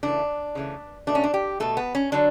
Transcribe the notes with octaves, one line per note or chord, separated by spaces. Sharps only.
C#3 E3 A3 D4
C#3 E3 A3
B2 A3 D4
C#4
D4
G4
B2 A3 A4
B3
C#4
D3 F#3 D4